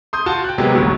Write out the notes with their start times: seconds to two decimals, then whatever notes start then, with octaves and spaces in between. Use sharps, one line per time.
0.13 C6 D#6 G6
0.26 F4 F#4 A5 C6
0.44 G5 F#6
0.58 C3 F#3 G#3 A#3 B3 G4
0.75 G1 D2 G#2 F#3